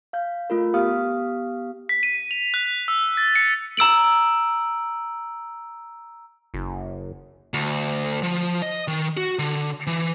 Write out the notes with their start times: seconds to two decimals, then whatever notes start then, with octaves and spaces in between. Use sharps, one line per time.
0.13 F5 G6
0.50 A3 F4 A#4
0.74 B3 G4 F5 D#6 F6
1.89 B6
2.03 D#7
2.31 F7
2.54 F#6
2.88 E6
3.17 A6
3.36 C#7
3.77 A#5 E6 D7 F#7
6.54 F#1
7.54 D2
8.23 F3
8.62 D#5
8.88 D#3
9.17 F#4
9.39 D3
9.87 E3